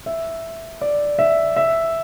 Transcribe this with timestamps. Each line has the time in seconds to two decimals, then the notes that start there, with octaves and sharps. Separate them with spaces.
0.06 E5
0.81 D5
1.19 E5
1.56 E5